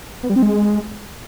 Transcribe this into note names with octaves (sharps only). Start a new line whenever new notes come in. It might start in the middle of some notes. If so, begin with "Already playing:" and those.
B3
G3
C4
G#3